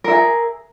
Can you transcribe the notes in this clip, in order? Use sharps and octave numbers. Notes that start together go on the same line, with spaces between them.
G#4 A#4 E5